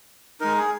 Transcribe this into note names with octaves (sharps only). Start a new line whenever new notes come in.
G#3 D#4 A#4
G#4